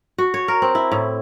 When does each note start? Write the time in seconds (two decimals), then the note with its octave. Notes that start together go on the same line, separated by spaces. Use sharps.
0.18 F#4
0.34 C#5
0.48 A#4
0.62 C4
0.75 E4
0.92 A2